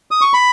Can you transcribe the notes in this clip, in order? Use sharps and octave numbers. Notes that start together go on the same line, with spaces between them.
D#6
C#6
B5